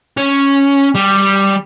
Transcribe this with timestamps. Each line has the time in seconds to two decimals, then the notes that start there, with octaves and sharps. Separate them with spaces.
0.17 C#4
0.95 G3